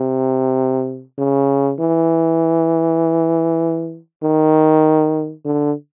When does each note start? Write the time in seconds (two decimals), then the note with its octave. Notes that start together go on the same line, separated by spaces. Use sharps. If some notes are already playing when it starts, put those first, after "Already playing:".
Already playing: C3
1.18 C#3
1.79 E3
4.23 D#3
5.45 D3